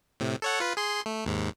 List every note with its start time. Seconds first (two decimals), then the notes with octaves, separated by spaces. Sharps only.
0.20 A2 C3
0.42 A4 C#5 F#5
0.60 F4 B4
0.77 G#4 C6
1.06 A3
1.25 D#2 G#2